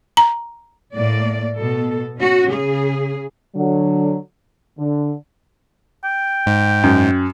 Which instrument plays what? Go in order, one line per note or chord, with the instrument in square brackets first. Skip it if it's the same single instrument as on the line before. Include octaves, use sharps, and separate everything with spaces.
[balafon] A#5
[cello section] A2 A#3 D5
B2 A4
C#4 F#4
C#3 G#4
[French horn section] D3 F#3
D3
[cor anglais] G5
[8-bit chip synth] G#2
[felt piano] F#2